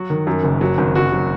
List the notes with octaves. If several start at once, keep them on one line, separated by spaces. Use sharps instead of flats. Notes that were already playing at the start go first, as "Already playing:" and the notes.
Already playing: F#3 F#4
D#3
F#2
F#1
F#3
G#1
F#1 F#4
F#3